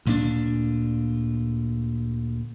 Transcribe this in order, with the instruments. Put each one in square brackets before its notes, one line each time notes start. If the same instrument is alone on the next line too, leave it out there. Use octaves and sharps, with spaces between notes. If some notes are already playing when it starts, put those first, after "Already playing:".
[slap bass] D2 A#2 G#3 D4